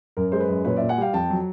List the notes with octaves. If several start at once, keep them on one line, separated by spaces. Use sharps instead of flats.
F#2 A#4
G#3 C5
B4
F#2
A#2 B4 C#5
A#2 D5 E5
F#5 G#5
G3 F5 G5
F2 G5 A5
F#3